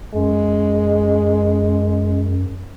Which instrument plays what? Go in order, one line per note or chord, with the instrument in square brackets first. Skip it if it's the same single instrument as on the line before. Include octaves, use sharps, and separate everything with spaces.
[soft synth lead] F#2 [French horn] G#3